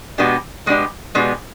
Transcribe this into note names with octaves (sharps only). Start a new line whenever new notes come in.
B2 G#3 B3 D4 G4
B2 G#3 B3 D4 G4
B2 G#3 B3 D4 G4